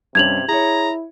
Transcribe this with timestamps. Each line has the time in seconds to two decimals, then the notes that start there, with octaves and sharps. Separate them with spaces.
0.15 G2 C3 C#4 G#6 F7 F#7
0.48 E4 G#4 C#5 A#5